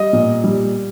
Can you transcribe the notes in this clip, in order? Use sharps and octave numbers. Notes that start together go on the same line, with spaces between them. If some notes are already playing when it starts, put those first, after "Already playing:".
Already playing: G3 D#5
A#2
G3